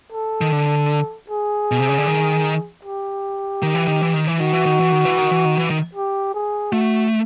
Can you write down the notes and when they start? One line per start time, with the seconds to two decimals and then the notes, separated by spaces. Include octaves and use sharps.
0.12 A4
0.41 D#3
0.52 D3
1.30 G#4
1.71 B2
1.80 C3
1.89 C#3
1.98 D3
2.08 D#3
2.85 G4
3.62 D#3
3.75 E3
3.88 D#3
4.02 E3
4.14 D#3
4.27 E3
4.40 D#3 F#4
4.53 E3
4.66 D#3
4.79 E3
4.92 D#3
5.05 E3
5.18 D#3
5.32 E3
5.45 D#3
5.57 E3
5.70 D#3
5.95 G4
6.34 G#4
6.72 A3 F#4